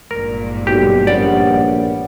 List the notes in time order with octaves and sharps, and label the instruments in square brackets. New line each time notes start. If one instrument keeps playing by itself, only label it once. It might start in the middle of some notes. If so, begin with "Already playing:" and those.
[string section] G#1 G2 A#2 [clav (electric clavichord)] A#4
[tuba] B1 [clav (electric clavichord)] G4
[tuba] A#1 [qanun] G3 B3 C#4 [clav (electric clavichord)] D5